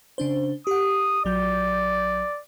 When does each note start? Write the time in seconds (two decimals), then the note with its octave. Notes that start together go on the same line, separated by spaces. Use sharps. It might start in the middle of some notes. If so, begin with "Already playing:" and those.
0.18 C#3 D4 C5
0.67 G4 F#5 D#6
1.25 A#1 F#3 D5 G6